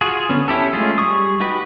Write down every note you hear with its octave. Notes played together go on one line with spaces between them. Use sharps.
F4 F#4 G#4
D3 B3 C#4
C#4 E4 G4 A4
G#3 A3 C#4 F4 G#4
G3 G#4 C#6 D#6
D#4 F#4 G4 B4